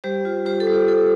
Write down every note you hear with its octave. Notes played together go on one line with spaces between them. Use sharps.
G3 G4 C5
F4
F4 G4 C5
A4
G3
G4
F4 A4